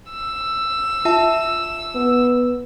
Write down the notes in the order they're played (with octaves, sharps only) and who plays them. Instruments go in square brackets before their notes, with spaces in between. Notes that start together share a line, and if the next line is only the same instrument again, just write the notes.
[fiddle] E6
[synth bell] F4 E5 A5
[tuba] B3